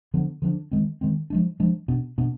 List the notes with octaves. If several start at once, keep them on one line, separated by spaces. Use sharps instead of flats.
D3 F3 B3 D4
D3 F3 B3 D4
D#3 G#3 C4
D#3 G#3 C4
F3 G#3 D4
F3 G#3 D4
B2 B3 D4
B2 B3 D4